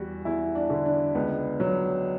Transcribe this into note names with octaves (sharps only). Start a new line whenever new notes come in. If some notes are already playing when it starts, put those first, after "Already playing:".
Already playing: E2 G3 F#4
E2 E4
D4
D3
D4
C#2 B3
F#3